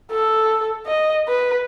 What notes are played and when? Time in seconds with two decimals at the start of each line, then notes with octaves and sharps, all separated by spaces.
0.12 A4
0.86 D#5
1.28 B4